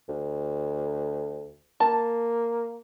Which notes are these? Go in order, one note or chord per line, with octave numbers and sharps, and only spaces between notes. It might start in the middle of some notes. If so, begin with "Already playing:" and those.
D2
A#3 A5